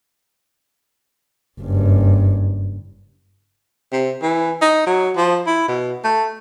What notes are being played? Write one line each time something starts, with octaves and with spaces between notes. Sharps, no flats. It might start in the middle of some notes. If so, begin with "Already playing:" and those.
F#1 G2
C3
E3
D#4
F#3
F3
E4
B2
A3